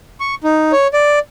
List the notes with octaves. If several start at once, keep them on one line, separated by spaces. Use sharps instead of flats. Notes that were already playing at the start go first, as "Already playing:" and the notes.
C#6
D#4
C#5
D5